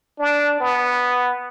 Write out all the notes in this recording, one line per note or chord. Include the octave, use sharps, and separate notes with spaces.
D4
B3